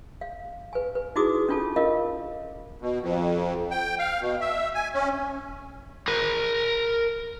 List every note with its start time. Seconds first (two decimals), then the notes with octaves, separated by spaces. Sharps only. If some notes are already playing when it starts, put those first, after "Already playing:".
0.21 F5
0.73 B4 G#5
0.95 B4
1.16 D#4 E4 F#4 G#4 D6 D#6
1.49 C#4 D4 F4 A4 A5
1.76 F4 A#4 D#5 F5
2.81 B2
3.01 F2
3.71 G5
3.99 F5
4.21 B2
4.41 E5
4.75 G#5
4.94 C#4
6.08 A#4 B5